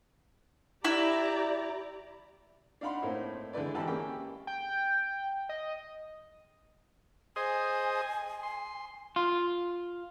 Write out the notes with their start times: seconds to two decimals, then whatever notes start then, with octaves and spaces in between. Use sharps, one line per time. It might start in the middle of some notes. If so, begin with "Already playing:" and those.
0.85 E4 G4 D5 A#5
2.81 D4 D#4 F5 F#5 B5 C6
3.02 A2 A#3 C4 D#4 E4
3.53 D3 G#3 E4 B4 D5
3.74 G#1 E3 G4 A5 B5 E6
3.87 A#3 C#4 G4 G#4 G5
4.47 G5
5.49 D#5
7.36 G#4 C5 D#5 G#5
8.43 C6
9.16 F4